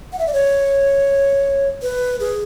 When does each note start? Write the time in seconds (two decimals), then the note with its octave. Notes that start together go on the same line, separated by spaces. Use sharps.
0.12 F#5
0.19 E5
0.27 D5
0.33 C#5
1.82 B4
2.20 G#4